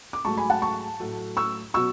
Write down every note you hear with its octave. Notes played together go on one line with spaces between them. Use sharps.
D6
G#2 F#3 A3 A5 C#6
G#5 B5
F#5 A5
A5 C#6
A2 F#3 A3
C#6 E6
B2 F#3 C#6 E6